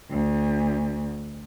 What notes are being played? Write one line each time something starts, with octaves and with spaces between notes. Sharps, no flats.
D2